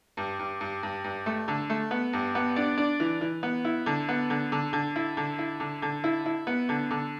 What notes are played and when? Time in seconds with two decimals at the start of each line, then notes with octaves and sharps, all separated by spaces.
0.17 G2
0.39 G2
0.61 G2
0.83 G2
1.04 G2
1.26 A3
1.48 D3
1.70 A3
1.91 B3
2.13 G2
2.35 B3
2.56 D4
2.78 D4
3.00 E3
3.21 E3
3.43 B3
3.65 E4
3.86 D3
4.09 B3
4.30 D3
4.52 D3
4.73 D3
4.96 E4
5.17 D3
5.39 E4
5.60 D3
5.82 D3
6.04 E4
6.26 E4
6.47 B3
6.69 D3
6.91 D3